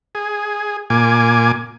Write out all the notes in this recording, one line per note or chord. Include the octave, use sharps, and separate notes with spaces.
G#4
A#2 G#5 D6